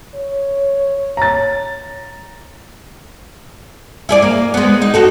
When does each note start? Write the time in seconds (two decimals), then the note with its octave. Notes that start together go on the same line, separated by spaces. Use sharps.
0.15 C#5
1.17 A#5 A6
4.09 E4 G#4 D5
4.22 A#3
4.54 G#3 B3
4.82 D#4
4.94 D#4 F#4 A4